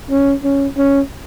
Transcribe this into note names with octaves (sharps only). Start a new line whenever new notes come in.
C#4
C#4
C#4